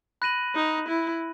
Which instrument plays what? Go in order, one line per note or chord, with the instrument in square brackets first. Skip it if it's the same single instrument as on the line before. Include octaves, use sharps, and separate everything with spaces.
[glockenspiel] B5 F#6 A#6 D#7 F#7
[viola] D#4
E4